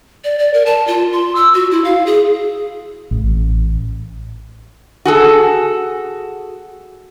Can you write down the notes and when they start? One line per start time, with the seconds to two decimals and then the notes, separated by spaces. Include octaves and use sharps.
0.24 D5
0.39 D5
0.54 A#4
0.66 A5
0.87 F4
1.13 C6
1.35 E6
1.54 F#4
1.71 E4
1.84 F5
2.06 G#4
3.11 A1
5.05 F#4 G#4 A4